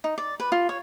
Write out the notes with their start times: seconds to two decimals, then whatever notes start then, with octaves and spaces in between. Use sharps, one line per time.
0.04 D#4
0.18 D5
0.40 B4
0.52 F4
0.69 C#5